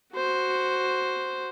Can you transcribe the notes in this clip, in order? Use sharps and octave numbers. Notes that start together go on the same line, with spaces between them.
F#4 C5